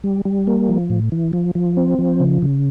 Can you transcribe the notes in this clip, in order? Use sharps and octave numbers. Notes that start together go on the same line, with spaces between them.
G3
G3
A#3
F3
A2
E3
F3
F3
C4
F3
C#3
C#3